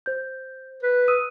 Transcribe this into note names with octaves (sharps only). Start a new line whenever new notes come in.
C5 G6
B4
D#6 E6 D#7